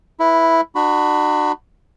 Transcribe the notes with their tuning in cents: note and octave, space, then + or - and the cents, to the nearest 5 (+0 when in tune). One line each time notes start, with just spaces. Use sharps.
E4 +0 B4 -20
D4 +40 F#4 +0 B5 +0